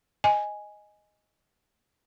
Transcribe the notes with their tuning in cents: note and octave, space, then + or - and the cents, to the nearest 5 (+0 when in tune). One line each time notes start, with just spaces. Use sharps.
D#5 +0 G#5 +0